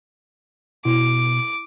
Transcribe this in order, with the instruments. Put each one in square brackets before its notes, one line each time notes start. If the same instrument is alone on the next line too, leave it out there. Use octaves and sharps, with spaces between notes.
[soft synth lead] B2 [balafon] E4 [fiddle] D6